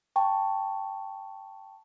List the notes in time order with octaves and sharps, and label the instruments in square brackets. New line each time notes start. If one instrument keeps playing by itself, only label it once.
[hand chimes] G5 A5 C#6